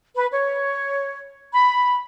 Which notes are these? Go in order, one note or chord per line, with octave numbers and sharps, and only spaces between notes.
B4
C#5
B5